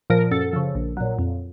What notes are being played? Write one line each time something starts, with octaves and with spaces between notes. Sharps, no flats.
A#2 F3 A#4
F#2 A4
C#3 F3
A#1
A#2 F#3
F2